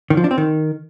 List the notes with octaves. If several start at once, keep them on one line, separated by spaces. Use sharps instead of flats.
D#3
F3
D4
C4
D#3